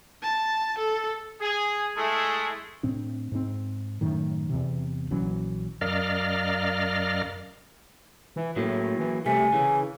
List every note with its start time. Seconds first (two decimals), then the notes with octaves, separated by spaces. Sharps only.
0.23 A5
0.78 A4
1.41 G#4
1.97 G#3 A3 E4 G#4 A4
2.83 A2 C4 D4
3.32 G#2 C4
4.01 F#2 A2 D#3
4.50 E2 C3
5.11 A#1 E3 F#3 C#4
5.81 F#2 A#4 D5 D#5 F5 F6
8.36 E3
8.56 A2 F#3 A#3
8.99 E3
9.26 C3 G3 A3 G#5
9.53 C#3 E3